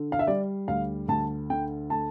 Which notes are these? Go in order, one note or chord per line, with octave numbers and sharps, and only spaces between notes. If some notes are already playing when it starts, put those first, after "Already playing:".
Already playing: D3
F5
E5
G3 D5
D2 F5
D2 A5
D3 G5
A3 A5